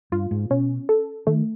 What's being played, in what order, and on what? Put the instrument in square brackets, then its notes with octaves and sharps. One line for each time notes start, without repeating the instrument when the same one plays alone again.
[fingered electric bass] G2 [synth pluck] F4
[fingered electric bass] G#2
[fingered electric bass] B2 [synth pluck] C#4
[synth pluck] A4
[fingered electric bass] D#3 [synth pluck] A3